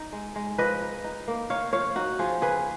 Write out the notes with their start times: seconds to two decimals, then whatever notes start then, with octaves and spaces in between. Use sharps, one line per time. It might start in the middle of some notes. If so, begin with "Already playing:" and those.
Already playing: D#4
0.12 G#3
0.36 G#3
0.58 F3 B4 D#5
0.81 D#4
1.04 D#4
1.28 A#3
1.50 D#4 C#5 F5
1.73 F3 C#5 F5
1.96 D#4 F#4
2.19 F3 F4 G#4
2.42 C#3 G#4 B4